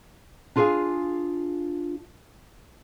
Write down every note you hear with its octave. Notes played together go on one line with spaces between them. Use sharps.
D4 F4 G#4 C5 F5 G#5